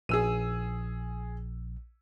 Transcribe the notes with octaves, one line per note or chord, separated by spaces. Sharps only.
A#1 G#4 E6 D#7